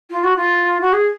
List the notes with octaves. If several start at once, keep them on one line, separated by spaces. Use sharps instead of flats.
F4
F#4
F4
F#4
G#4